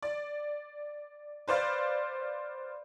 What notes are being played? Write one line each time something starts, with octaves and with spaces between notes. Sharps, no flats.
D5
B4 C5 D5 F5